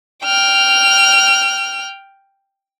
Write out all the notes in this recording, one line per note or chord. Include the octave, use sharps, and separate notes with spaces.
G5 F6